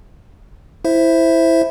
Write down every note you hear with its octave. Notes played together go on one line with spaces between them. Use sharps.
E4 C5 E5